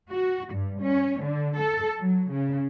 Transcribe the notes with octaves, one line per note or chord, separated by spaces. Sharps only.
F#4
G2
C#4
D3
A4
F#3
C#3